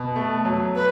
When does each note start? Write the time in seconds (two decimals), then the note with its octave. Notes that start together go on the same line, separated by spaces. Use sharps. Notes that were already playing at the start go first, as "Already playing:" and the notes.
Already playing: B2
0.16 A3
0.45 F#3
0.75 B4